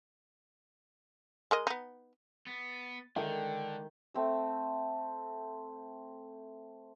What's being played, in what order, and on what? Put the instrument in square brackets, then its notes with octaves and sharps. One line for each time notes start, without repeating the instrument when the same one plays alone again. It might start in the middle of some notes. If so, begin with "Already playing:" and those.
[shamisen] G#3 A#4 D#5
B3 D#4
[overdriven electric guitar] B3 [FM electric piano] A6
[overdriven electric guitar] D3 [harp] D#3 [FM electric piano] G#3 A4 [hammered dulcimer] G5
[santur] A3 C4 E6